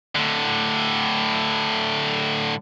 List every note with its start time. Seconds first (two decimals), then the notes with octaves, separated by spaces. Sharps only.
0.15 A2 D3